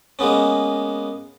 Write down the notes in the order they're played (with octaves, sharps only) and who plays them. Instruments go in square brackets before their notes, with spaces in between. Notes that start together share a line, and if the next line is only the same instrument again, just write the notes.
[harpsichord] G#3 A#3 B3 C#4